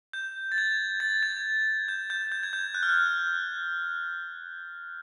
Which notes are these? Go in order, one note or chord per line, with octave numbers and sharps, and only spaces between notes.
G6
A6
G#6
A6
G#6
G6
G6
G6
G#6
G6
F#6
F6
F#6